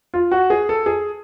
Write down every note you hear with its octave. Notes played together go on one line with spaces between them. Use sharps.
F4
F#4
G#4
A4
G#4